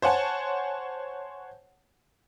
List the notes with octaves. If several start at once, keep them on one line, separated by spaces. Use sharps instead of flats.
C5 C#5 F#5 G#5 A5